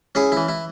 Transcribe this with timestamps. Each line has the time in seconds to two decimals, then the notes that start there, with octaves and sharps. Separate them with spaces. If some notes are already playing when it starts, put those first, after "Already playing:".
0.15 C#4 E4 G#4
0.32 E3 E4
0.49 E4